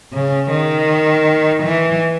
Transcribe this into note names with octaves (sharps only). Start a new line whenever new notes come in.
C#3
D#3
E3